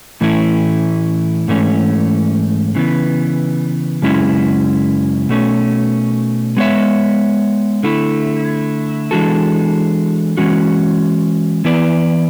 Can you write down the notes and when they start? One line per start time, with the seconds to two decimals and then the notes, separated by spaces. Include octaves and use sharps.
0.21 A2 E3 A3 C#4 E4
1.48 G#2 E3 A3 C#4
2.75 C#3 E3 B3
4.02 F#2 C#3 G#3 C#4 E4
5.29 B2 A3 C#4
6.57 G#3 B3 F#4 C#5 E5
7.83 D3 A3 E4
9.11 E3 G#3 D4 F#4 A4
10.37 E3 G#3 C#4 F#4
11.65 E3 B3 E4 B4 D5